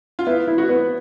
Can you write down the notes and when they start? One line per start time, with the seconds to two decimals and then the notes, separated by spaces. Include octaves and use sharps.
0.19 F4
0.27 B3 E4
0.47 E4
0.58 F#4
0.69 B3